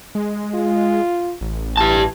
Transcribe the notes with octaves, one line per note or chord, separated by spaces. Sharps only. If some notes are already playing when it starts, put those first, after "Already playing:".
G#3
F4
A1
E3 G4 A5